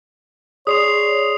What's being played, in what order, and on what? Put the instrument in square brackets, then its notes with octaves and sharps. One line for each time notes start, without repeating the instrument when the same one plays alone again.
[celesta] G#4 D5 C6 [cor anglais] C#5 [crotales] D#6 C7 F7